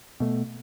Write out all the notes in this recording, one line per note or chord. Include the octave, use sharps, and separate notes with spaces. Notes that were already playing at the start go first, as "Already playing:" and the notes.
B2 A3